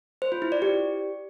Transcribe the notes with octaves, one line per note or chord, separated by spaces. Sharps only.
C5
F4
E4
D5
G4